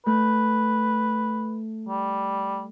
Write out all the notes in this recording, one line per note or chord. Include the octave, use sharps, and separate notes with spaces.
A3 B4
G3